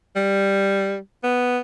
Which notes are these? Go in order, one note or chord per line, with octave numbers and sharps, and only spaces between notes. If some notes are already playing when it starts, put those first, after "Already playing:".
G3
B3